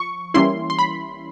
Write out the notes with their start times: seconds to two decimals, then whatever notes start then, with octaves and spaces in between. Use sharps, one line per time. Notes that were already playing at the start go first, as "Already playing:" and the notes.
Already playing: F3 C#6
0.34 E3 G3 A#3 C#4 E4 C6
0.70 C6
0.79 B5